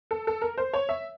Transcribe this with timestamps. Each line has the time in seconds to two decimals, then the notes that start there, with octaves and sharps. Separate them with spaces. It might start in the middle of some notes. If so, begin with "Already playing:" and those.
0.11 A4
0.27 A4
0.42 A#4
0.58 C5
0.74 C#5
0.89 E5